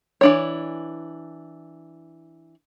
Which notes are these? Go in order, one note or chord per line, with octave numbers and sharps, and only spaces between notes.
E3 D4 C#5